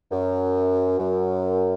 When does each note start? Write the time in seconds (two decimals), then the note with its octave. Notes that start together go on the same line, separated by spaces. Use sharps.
0.12 F#2
0.99 F#2